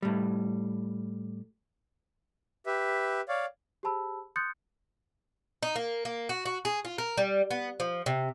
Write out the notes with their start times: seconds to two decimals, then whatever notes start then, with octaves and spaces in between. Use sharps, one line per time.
0.02 A2 G3
2.66 G4 B4 E5
3.28 C#5 D5 F5
3.83 G4 G#4 C5 A5 B5 E6
4.36 C6 D#6 F#6 G6 A6 C#7
5.63 D#4
5.76 A#3
6.05 A#3
6.29 F#4
6.46 F#4
6.65 G#4
6.85 F4
6.98 A#4
7.18 G3
7.51 B3
7.80 F3
8.06 C3